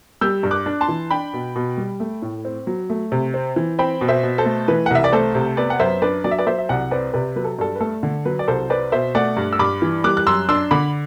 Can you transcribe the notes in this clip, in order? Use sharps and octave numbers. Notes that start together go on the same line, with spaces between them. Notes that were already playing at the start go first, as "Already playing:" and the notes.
G3 E6 G6
G2
D6 F#6
D4
A5 C6
E3
D4 G5 B5
B2
B2
G3
A3
A2
C4
F#3
A3
C3
C4
E3
C4 G5 B5
B2
C5 E5
B2
A4 C5
A3
E3 B4
F#5
C2 E5
D5
A3 A4 C5
C3
B3 B4 D5
F#5
F#2 C5 E5
D4 B4 D5
F#3 D5
E5
B4 D5
F#3 C5 E5
E5
C2 D5 F#5
C4 B4 D5
C3 B4 D5
F#3 B4
A4
G2 A4
B4
A3 A4
D3
F#3 B4
D5
C2 A4 C5
C4 B4 D5
B2 C5 E5
A3 D5 F#5
G2
E6
G2 B5 D6
E3
G3 D6 F#6
F#6
F#2 C6 E6
D4 C6 E6
D3 B5 D6